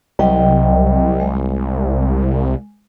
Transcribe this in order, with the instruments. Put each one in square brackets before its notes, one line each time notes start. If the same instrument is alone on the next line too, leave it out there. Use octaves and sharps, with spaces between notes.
[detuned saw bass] C2 [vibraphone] F#3 D#5 G5
[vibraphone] G#3